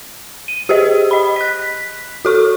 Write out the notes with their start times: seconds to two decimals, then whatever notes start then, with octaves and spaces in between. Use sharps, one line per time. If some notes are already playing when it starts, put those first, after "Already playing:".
0.48 D#7
0.69 G4 G#4 C5 D#5
1.11 D#5 B5
1.36 F#6 B6
2.25 F#4 A4 C#6